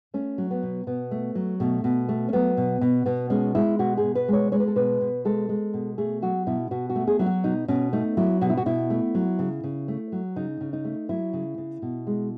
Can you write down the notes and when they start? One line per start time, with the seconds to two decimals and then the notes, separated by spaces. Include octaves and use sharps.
0.14 A3 C#4
0.38 F#3
0.51 B3
0.63 B2
0.87 B2 B3
1.11 A3
1.35 F#3
1.60 B2 A3
1.84 B2
2.09 A3
2.29 C#4
2.33 F#3 B3
2.57 B2
2.81 B2
3.06 B2 B3
3.30 G#3 C#4
3.55 G#3 E4
3.79 B2 F#4
3.97 G#4
4.03 B2
4.15 B4
4.28 G#3 C#5
4.52 G#3 C#5
4.60 B4
4.67 A4
4.76 B2 B4
5.01 B2
5.25 G#3 A4
5.49 G#3
5.74 B2
5.98 A3 G#4
6.22 F#3 F#4
6.47 B2 E4
6.71 B2 F#4
6.90 F#4
6.96 A3
7.08 G#4
7.19 F#3 E4
7.26 F#4
7.44 B2 D#4
7.68 B2 C#4
7.93 A3 D#4
8.17 F#3 E4
8.41 B2 F#4
8.50 E4
8.57 F#4
8.66 B2 E4
8.90 A3
9.15 F#3
9.39 C#3
9.64 C#3
9.88 A3
10.12 F#3
10.36 C#3 D#4
10.61 C#3
10.73 D#4
10.85 A3
11.09 F#3 E4
11.33 C#3
11.58 C#3
11.82 B2
12.07 G#3